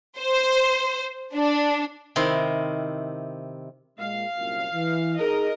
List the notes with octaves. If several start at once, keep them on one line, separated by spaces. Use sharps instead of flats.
C5
D4
C3 D#3 E4 C6
A#2 G#3 F5
C2 F#2 A#2
E3
D#4 G#4 A#4 D#5